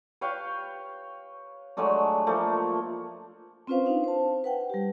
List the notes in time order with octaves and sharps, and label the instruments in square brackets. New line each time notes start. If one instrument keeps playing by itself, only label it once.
[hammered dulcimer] B4 C#5 F5 G5
F#3 G#3 A3 D4
F3 A3 A#3
[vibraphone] C4 C#4 F4 B4 C5 F5
D4 D#4 F5
C5 A5
B4 F#5 G5
G3 G4